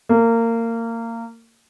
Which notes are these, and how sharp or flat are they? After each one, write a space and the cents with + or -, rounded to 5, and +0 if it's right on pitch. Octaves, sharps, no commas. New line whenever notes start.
A#3 -25